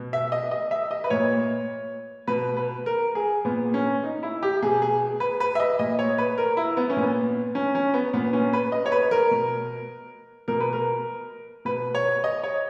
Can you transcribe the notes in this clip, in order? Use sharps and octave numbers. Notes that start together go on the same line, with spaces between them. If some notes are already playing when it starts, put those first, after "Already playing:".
Already playing: B2
E5
D#5
D#5
E5
D#5
B4
A#2 C#5
B2 B4
B4
A#4
G#4
A#2 B3
C#4
D#4
E4
G4
B2 G#4
G#4
B4
B4
E5
D#5
A#2 D#5
C#5
B4
A#4
E4
B3
C#4
A#2
B3
C#4
C#4
B3
A#2 B3
C#4
B4
D#5
C#5
B4
A#4
B2
B2 A#4
B4
A#4
B2 B4
C#5
D#5
C#5